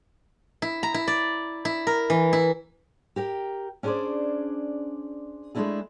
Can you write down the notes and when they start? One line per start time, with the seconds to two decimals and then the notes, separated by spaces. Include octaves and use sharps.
0.62 E4
0.83 A#5
0.94 E4
1.08 D5
1.65 E4
1.87 A#4
2.10 E3
2.33 E4
3.16 G4 A#4 G5
3.83 C#4 D4 G#4 A#4 C5 D5
5.55 G#3 A3 C#4 D4 E4 G#4